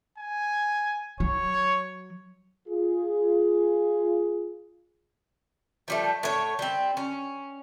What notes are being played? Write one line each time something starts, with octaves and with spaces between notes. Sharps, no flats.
G#5
F#3 C#5
F4 G#4
F3 G3 A3
A2 C#5
G3 C4
C#4